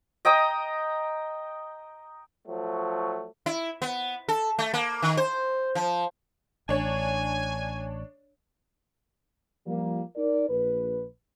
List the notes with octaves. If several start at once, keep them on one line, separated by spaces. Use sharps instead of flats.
D#5 G5 A#5 D#6
F3 F#3 A3
E4
B3
A4
A3
A#3
D#3
C5
F3
A1 D4 C#5 G#5
F3 G3 A#3
D#4 A#4 D5
A#1 B4